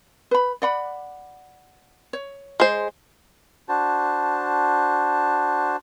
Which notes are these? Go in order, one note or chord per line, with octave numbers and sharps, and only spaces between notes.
B4 B5
D5 F#5 B5
C#5
G#3 C5
D4 F#4 C5 A5